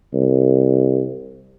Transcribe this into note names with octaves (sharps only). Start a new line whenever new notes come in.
C2